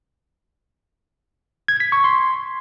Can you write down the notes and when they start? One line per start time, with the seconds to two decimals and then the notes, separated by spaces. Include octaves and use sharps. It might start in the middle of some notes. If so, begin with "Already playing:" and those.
1.68 G#6
1.80 B6
1.92 C#6
2.04 C6